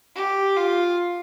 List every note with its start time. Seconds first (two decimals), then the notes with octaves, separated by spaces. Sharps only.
0.15 G4
0.57 F4